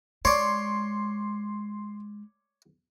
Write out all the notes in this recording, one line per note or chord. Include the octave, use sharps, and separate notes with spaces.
G#3 C#5 D5 C6